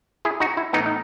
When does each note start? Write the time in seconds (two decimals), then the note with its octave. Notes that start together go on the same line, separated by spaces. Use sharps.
0.25 E4 G#4
0.40 D#4 F#4
0.57 E4
0.73 A2 E3 B3 D#4
0.86 D#4